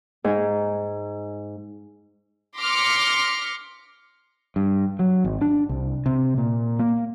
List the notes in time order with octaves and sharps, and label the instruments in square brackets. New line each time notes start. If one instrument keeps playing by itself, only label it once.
[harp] G#2 G#5
[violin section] C6 D6 F6 A#6 B6 C#7
[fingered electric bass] G2
F#3
G#1
D4
C2
C3
A#2
A#3